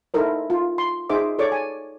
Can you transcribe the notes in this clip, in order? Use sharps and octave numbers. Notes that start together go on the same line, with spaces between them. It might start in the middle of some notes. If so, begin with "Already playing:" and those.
D#4 E4 A4 A#4 C5
F4
C6
D#4 G#4 C5 E5 D6
A4 C#5 D5 C#6 D6
G#5